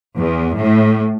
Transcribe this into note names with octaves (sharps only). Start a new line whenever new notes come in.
E2
A2